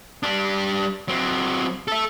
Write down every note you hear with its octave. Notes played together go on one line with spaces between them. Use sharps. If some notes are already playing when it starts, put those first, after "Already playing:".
G3 D4
F#3 C4
A4 E5